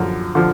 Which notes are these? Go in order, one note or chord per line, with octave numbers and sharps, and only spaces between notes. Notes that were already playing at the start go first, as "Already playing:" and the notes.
Already playing: F#2 D3 F3
D3 F3